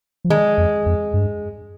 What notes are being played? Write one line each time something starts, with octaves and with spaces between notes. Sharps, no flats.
F3
D#3 G#3
F2
F2
G2